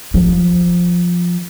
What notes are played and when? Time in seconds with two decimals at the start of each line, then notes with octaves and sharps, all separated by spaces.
0.14 F3